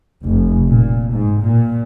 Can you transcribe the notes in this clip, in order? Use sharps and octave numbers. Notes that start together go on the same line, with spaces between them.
F1
A#2
G#2
A#2